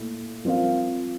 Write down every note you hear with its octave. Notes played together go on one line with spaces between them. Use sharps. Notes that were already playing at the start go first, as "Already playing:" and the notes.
Already playing: A#2 A3 E4
F3 C4 F4 A#4 F5